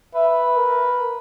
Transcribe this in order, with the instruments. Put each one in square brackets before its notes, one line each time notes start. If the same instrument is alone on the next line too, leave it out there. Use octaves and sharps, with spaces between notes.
[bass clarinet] B4 [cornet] E5
[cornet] A#4